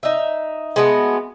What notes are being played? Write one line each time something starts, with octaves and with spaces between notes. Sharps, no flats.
D#4 E5
G#3 A3 B3 F#4